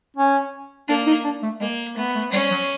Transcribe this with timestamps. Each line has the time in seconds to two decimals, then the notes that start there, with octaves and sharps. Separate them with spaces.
0.16 C#4
0.88 A#3 D4
1.06 D#4
1.24 D4
1.43 A3
1.60 G#3 A#3
1.96 A3 B3
2.15 A3
2.32 G3 C#4
2.51 F#3